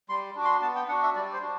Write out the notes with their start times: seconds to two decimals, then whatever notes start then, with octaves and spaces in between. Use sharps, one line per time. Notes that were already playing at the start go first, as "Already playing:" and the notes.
0.09 G3 C6
0.36 D4 F#4 D6
0.45 C6
0.62 B3 A5
0.75 G5
0.89 D4 F#4 F#5
1.03 E5
1.15 G3 D5
1.33 C5
1.42 D4 F#4